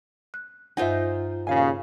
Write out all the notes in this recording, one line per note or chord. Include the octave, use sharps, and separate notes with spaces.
F#6
G2 D#4 F4 C5 E5 F#5 G#5
D#2 A#2 C#3 F5 G#5